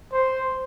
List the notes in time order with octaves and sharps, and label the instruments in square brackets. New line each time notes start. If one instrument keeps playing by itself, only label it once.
[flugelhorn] C5